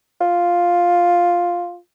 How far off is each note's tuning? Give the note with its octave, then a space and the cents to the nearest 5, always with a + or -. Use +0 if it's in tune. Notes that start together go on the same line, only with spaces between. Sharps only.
F4 +5